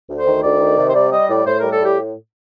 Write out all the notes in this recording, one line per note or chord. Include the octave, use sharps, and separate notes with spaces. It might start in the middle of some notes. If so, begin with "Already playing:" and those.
D2
C5
D#3
D2 D5
D#3
C3
C5
G3 D5
G3 D#5
A2 D5
A2 C5
G3 A#4
A4
A2 G4